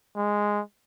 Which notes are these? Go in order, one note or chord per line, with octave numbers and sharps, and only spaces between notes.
G#3